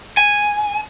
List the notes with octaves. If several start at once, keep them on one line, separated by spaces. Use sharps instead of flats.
G#5